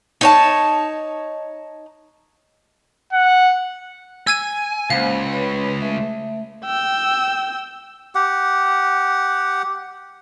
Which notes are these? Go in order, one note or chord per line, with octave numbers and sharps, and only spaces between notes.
D#4 C#5 A5
F#5
G#5 E6 G#6 D#7
C#2 A#3 C5 F5 F#5
B4 C#5 B5
A3 E5
G5 E6
G4 F#5